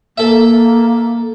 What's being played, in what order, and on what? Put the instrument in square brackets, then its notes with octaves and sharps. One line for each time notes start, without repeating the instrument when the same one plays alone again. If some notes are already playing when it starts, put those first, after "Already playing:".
[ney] A#3 [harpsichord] A4 E5